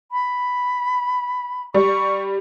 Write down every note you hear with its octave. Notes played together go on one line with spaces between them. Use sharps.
B5
G3 C#6